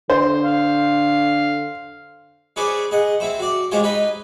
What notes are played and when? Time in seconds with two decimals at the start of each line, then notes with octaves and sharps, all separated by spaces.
0.10 D3 C5
0.44 F5
2.56 C#4 G#4 B4 C5 D5
2.91 G#4 D#5 F#5
3.20 C4 E4 C5
3.39 F#4 D5
3.71 G#3 C#4 F4 G4 C5 C#5
3.83 D#4 B4 D#5 B5